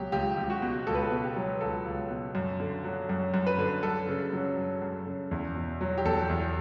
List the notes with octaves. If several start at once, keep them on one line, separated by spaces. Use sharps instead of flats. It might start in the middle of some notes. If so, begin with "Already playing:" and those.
Already playing: C#2 B2 F#3 G4
C#2 G4
C#2
F#4
B2
C#2 A4
B4
A4
B2
G4
F#3
C#2 A4
C#2
B2
F#2
D3
F#3
F#2
F#2
B4
D3
F#2 A4
C#3
F#3
F#2
F#2
C#3
E2
B2
F#3
G4
E2 A4
E2